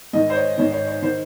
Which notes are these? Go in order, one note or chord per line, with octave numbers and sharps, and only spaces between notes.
G#2 D#3 D#5
C5
C#5
G#2 D#3 C#5
C#5
C#5
D#3 C5